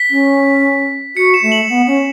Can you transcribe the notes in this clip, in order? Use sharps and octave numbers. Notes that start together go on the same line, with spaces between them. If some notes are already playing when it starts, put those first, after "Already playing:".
Already playing: B6
C#4
F#4 C#7
E7
A3
F#7
B3
C#4